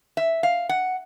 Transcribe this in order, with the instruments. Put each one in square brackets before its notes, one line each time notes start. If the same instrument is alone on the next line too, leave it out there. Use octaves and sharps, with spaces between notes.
[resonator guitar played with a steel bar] E5
F5
F#5